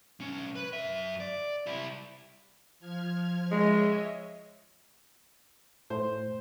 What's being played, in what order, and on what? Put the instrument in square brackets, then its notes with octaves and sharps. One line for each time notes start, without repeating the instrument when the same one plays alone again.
[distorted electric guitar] B1 C#4
B4
F#2 E5
D5
G3 E4
[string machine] F3 F6 G#6
[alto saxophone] G#3 [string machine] C#5 D#5 E5
[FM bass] A2 [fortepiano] C5